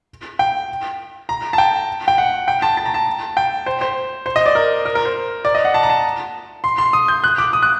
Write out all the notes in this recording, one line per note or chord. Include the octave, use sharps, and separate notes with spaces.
G5
A#5
A5
G5
G5
F#5
G5
A5
A5
A#5
A5
G5
C5
C5
C5
D#5
D5
A#4
A#4
A#4
C5
D5
D#5
F#5
A5
A#5
A5
C6
C6
D#6
G6
F#6
D6
D#6
F#6